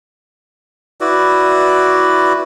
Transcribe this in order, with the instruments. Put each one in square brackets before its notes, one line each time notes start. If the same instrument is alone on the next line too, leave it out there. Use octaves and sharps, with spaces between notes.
[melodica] E4 F#4 B4 D5